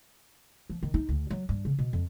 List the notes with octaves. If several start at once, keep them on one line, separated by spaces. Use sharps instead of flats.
F3
D#3
D#4
D2
F#3
G2
C#3
B2
F2